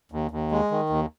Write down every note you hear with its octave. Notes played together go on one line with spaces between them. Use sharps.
D#2
D#2
G#3
D#3
D#2